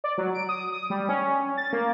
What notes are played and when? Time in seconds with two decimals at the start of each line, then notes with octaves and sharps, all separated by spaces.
0.04 D5
0.18 F#3
0.35 D7
0.49 D#6
0.72 D#6
0.90 G3
1.09 C#4
1.57 A6
1.73 A#3